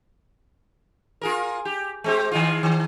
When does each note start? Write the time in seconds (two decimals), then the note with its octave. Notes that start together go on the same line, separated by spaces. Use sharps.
1.21 F4 G#4 A#4
1.65 G4
2.04 G#3 C4 G4
2.32 D#3 G#3 F4
2.63 D#3